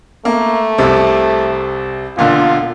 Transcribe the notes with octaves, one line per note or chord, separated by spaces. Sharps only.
A3 A#3
C2 C3
E1 A#2 D3 F4